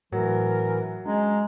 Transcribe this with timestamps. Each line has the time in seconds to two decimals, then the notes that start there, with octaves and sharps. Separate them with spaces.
0.12 A2 E3 F#3 A#4
1.06 G#3 C#4 D4 A#5